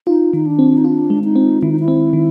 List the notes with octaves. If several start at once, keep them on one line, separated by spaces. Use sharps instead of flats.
D#4 F4
D#3 D#4
D4
C4
D#4
D4 F4
G#3
D#4
C4
D#3 E4
D#4
E4
C4
D#3